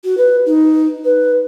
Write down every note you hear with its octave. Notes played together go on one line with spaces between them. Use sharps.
F#4
B4
D#4
B4